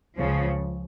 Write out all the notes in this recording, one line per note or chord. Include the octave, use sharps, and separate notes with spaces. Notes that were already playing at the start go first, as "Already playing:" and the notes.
C#2 C#3 F3